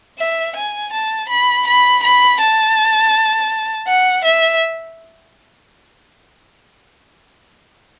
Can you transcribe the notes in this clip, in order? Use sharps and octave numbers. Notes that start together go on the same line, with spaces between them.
E5
G#5
A5
B5
B5
B5
A5
F#5
E5